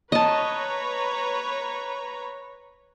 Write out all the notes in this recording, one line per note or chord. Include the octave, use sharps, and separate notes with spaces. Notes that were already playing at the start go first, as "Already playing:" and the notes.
B4 C#5 D#5 A5 A#5